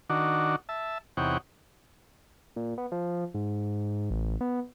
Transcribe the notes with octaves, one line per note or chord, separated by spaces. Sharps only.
D#3 D4 F#4
E5 A5
E2 C3 D#4 C#5 F#5 G5
A#2
B3
F3
G#2
A1
B3